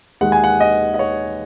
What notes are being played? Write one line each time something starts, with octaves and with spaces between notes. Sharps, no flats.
D#2 D#3 G#3 F#5
G#5
F#5
D#5
D#5
C#5